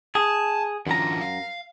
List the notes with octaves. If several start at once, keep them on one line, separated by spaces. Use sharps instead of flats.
G#4 A5
F#2 D3 E3 F4 A#5
F5